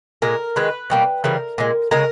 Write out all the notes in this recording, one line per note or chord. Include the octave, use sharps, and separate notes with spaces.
A#2 G#3 A#4
D#3 G#3 B4
B2 G3 A#3
C#3 E3 G3 A#4
A#2 G#3
C#3 G#3 A#4